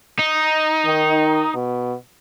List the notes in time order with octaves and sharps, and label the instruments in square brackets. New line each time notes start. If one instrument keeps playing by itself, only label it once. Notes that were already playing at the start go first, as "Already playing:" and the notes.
[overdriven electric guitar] D#4
[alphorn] D#3
B2